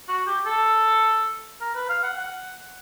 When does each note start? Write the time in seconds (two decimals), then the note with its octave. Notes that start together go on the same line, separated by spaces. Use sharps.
0.08 F#4
0.27 G4
0.46 A4
1.61 A#4
1.75 B4
1.89 F5
2.03 F#5
2.18 F#5